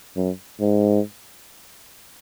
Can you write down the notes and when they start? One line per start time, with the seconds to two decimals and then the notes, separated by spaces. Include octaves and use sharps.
0.17 F#2
0.61 G#2